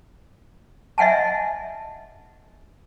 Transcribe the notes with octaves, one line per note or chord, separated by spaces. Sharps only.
D#5 E5 F#5 G#5 A5